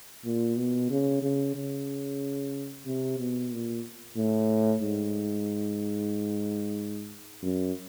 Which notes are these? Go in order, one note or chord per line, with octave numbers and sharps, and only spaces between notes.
A#2
B2
C#3
C#3
C#3
C3
B2
A#2
A2
G#2
F#2